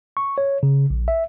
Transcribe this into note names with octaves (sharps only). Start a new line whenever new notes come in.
C#6
C#5
C#3
A#1
E5